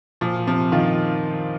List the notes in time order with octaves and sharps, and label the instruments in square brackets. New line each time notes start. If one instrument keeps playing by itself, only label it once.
[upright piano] A#2 [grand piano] F3
[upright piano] C3 [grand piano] F3
[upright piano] D#3 [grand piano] F4